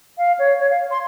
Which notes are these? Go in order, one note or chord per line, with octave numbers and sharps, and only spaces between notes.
F5
C#5
C#5
F5
C6